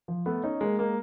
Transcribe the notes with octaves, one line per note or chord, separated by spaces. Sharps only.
F3
A3 B3
C#4 D#4
G#3 A#3
G#3 A#3